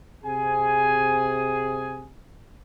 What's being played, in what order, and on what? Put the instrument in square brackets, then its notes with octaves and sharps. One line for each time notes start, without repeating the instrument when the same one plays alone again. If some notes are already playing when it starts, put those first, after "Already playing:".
[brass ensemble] C3 G#4 G#5